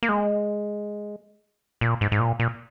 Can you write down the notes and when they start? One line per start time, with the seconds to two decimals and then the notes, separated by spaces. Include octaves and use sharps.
0.03 A#3
0.09 G#3
1.81 A#2
2.01 G#2
2.12 G#2
2.19 A#2
2.40 A#2